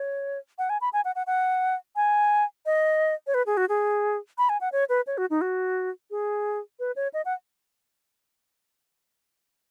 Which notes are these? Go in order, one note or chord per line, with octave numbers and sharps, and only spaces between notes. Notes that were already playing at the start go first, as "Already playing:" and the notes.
Already playing: C#5
F#5
G#5
B5
G#5
F#5
F#5
F#5
G#5
D#5
C#5
B4
G#4
F#4
G#4
B5
G#5
F#5
C#5
B4
C#5
F#4
D#4
F#4
G#4
B4
C#5
D#5
F#5